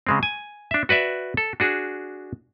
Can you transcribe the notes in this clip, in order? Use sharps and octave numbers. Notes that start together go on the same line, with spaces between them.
C#3 G#3 C4
G#5
D4 E5
F#4 B4 D5 E5
A4
D4 F#4 G#4